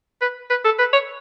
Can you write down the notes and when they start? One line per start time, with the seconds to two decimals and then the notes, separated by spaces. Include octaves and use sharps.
0.21 B4
0.50 B4
0.65 A4
0.79 B4
0.93 C#5